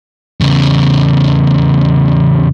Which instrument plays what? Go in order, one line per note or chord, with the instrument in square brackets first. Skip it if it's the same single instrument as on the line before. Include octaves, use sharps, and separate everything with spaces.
[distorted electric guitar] E2 C#3